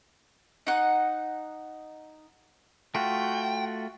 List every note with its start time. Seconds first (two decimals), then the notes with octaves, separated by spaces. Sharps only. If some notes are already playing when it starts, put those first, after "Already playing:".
0.67 D#4 F#5
2.95 A3 F4 F#4 G5